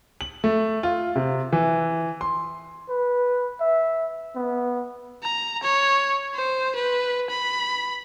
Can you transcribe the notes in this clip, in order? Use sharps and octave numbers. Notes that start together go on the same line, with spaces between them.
F#7
A3
F4
C3
E3
C6
B4
E5
B3
A#5
C#5
C5
B4
B5